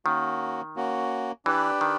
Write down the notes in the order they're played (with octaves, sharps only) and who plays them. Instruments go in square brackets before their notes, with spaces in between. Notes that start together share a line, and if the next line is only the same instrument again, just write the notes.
[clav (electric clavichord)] D#3 [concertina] A#3 C#4 F#4
[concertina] A#3 C#4 F#4
[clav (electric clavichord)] E3 [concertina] D4 G4 B4 D5
[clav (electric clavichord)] D#3